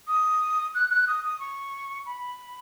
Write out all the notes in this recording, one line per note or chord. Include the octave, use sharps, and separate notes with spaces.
D#6
F#6
F#6
D#6
D#6
C#6
B5